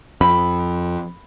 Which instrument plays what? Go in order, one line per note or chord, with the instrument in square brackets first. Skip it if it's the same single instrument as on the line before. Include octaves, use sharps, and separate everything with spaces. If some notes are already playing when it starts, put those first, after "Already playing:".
[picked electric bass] F2 [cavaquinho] B5